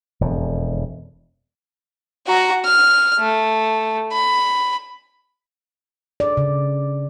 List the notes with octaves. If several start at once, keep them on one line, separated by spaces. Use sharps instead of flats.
E1 F2
F#4 A#5
F6
A3
B5
D5
C#3